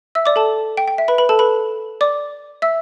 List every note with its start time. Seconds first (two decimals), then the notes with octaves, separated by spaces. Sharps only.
0.15 E5 E6
0.26 D5 D6
0.36 A4 A5
0.77 G5
0.88 G5
0.98 E5
1.08 B4 B5
1.18 B4 B5
1.29 A4 A5
1.39 B4 B5
2.01 D5 D6
2.62 E5 E6